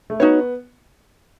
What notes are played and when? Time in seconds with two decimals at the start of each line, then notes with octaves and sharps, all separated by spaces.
0.10 A3
0.20 B3 D#4 F#4 C#5